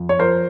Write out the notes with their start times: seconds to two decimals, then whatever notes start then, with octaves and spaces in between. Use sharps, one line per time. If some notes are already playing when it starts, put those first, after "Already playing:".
Already playing: F2
0.09 C#5
0.19 F3 A#4 C5